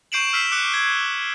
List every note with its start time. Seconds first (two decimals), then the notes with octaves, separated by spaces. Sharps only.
0.12 C#6 G6 C7 D7 E7 F#7
0.33 E6 F6 B6 C7 E7
0.52 D6 F6 F#6 C#7 G7
0.74 G#6 G7